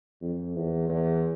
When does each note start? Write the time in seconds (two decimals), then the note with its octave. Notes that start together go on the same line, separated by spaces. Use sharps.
0.22 F2
0.55 E2
0.88 E2